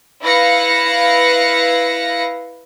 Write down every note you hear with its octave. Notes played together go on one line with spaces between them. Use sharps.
E4 B4 F5 A#6 C#7